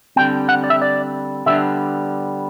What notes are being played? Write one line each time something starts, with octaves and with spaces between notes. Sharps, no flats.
D3 G3 C4 G5
F#5
D5
E5
D5
D3 G3 B3 D4 E5